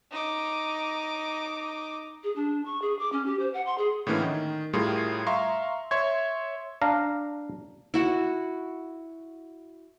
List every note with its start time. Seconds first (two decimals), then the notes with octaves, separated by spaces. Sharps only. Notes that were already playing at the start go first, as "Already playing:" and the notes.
0.11 D#4 D6
2.24 G#4
2.36 D4
2.65 C#6
2.82 G#4
2.99 D6
3.12 C#4
3.26 G4
3.39 C5
3.54 F#5
3.66 C6
3.78 G#4
4.07 A2 D3 E3 A#3 C#4
4.22 D#3
4.73 A2 G3 F4 G#4 A#4 C6
5.27 E5 F5 A#5 C6 C#6
5.91 C#5 E5 C6 C#6 G#6
6.82 D4 F5 A#5
7.94 E4 F#4 F#5